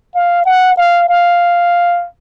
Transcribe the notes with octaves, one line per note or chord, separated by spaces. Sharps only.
F5
F#5
F5
F5